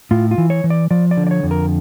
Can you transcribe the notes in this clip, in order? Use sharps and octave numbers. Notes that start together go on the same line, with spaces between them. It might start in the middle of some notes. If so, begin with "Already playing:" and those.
A2 F4
F4
E3
C#5
E3
D5
F3 D5
D5
D3
D5
C#5
F2
A#4